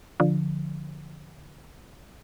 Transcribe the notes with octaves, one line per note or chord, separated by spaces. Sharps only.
D3 F3